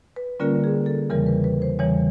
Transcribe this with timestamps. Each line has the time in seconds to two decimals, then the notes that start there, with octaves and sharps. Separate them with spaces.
0.16 B4
0.40 D3 G3 A#3 C#4 F4 A#4
0.64 G#4
0.86 A4
1.10 E2 C#3 E3 G3 A#4
1.26 B4
1.44 B4
1.62 C5
1.79 E2 C#3 E3 G3 C#5